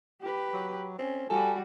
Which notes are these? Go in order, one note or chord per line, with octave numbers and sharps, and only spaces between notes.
G4 B4
F#3
C4 C#4
G3 F#4 A4 G#5